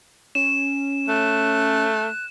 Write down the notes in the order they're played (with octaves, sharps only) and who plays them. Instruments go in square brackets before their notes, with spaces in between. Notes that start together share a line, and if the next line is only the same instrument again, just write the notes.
[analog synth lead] C#4 [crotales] E7
[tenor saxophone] A3 [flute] F#6